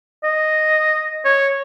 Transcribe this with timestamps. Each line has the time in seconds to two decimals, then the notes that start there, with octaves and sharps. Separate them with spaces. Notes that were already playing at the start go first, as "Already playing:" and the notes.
0.24 D#5
1.25 C#5